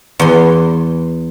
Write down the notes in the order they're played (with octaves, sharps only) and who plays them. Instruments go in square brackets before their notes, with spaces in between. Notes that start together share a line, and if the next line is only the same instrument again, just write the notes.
[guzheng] E2 C6